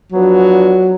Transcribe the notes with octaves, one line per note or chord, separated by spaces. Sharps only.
F3 F#3 B3 D4